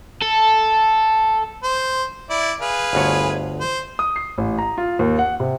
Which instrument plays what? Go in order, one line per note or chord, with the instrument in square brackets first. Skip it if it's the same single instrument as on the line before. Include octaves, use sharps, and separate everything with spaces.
[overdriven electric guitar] A4
[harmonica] C5
E4 D5
G#4 B4 F5
[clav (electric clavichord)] G1 D2 C#5
[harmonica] C5
[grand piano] D#6
C7
A1
A#5
F4
D#2
F#5
C3